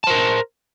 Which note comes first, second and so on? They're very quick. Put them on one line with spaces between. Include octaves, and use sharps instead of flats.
A5 C5 A#4